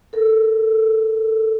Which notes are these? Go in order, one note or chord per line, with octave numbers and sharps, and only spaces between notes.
A4 A#4